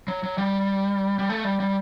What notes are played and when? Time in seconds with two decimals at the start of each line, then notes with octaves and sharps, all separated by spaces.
0.08 F#3
0.23 F#3
0.38 G3
1.19 G3
1.30 A3
1.45 G3
1.60 G3